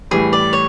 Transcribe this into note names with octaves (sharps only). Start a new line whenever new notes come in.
A2 E3 G3 G#4
D5
C#5